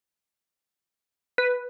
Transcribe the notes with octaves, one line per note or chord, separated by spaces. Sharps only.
B4